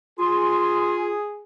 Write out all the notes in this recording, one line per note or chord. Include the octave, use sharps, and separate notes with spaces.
F4 G#4 C6